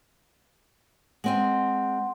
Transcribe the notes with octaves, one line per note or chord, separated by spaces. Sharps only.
G#3 C4 D#5 F#5 C6